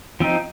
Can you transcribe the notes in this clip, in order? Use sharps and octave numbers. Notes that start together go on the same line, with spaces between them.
F3 C4 D#4